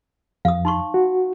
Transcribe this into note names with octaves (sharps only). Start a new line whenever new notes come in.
F2 F5 D#6
D#4 C6 C#6
F#4